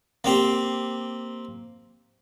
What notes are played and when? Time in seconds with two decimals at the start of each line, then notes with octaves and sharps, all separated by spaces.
0.24 A#3 C4 G4